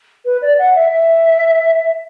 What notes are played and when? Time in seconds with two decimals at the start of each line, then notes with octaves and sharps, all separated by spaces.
0.25 B4
0.41 D5
0.58 F#5
0.75 E5
0.92 E5